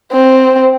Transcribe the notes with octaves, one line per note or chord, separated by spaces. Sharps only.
C4